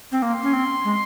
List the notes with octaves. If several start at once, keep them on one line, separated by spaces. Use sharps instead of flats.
C4
A#3 C6
C#4
C4
G#3